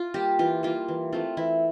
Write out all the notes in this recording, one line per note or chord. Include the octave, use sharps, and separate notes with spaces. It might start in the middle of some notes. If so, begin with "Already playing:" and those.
Already playing: F4
G3 A#3 G4
E3 F4
G3 A#3 F4
E3
A3 C4 F4
E3 E4